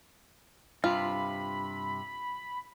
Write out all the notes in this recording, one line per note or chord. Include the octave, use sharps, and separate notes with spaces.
G2 C3 F4 B5